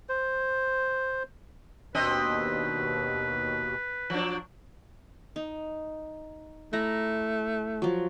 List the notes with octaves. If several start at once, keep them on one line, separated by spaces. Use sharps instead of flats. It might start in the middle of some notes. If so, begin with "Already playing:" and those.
C5
D#2 B2 C4 D4 B4 D#5
F3 F#3 D4
D#4
A3 E4 A#5
F3 F#3